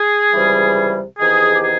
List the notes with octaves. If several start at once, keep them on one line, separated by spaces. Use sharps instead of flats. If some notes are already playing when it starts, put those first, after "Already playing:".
Already playing: G#4
C#2 C3 E3 G3
E2 C3 D#3 G#4
G4
G#4